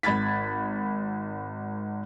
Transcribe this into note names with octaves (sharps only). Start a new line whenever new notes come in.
G#1 B5 G#6 A6 B6